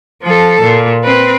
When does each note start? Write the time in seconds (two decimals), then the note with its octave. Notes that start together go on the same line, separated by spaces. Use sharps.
0.23 F3 A4
0.61 A#2
1.04 C4 B4